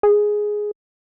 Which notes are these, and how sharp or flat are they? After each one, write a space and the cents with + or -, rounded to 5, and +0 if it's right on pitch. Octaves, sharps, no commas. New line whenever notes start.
G#4 +5